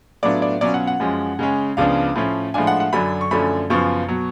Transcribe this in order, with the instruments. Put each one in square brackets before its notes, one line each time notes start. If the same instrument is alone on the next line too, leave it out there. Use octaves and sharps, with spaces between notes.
[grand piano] A2 F#3 B3 D4 F4 D5
D5
B2 F#3 C#4 F4 D5
F#5
F#5
F#2 F3 G#3 C#4
C#3 G#3 C#4
C#2 C#3 F3 B3 D4 F5
A2 F3 A3 C#4
A2 F3 G#3 D4 F4 G#5
F#5
F#5
F#2 D3 F#3 B5
C#6
F#2 D3 F3 A3 C#4 B5
F#2 C#3 F3 B3 F4 C#6
B2 F#3